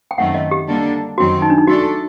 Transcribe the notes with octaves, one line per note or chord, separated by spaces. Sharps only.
G5
F#2 D#3 A3 C4 F#5
D#5
G4
D3 G3 A#3 D4 A4
F#2 D#3 F#3 C4 F#4
D#4
D4
D#4
A3 D4 F#4 A4